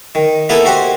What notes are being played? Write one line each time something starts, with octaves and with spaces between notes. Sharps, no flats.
D#3
A#3 B3 E4 G#4 A4 B4
F#4 G4 C5 F#5